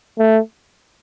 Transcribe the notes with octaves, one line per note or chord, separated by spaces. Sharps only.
A3